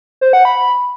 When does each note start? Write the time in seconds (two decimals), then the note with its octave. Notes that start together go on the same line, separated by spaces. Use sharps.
0.21 C5
0.33 F#5
0.45 B5